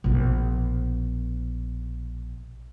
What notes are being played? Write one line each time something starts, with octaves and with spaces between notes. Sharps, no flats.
A#1 B2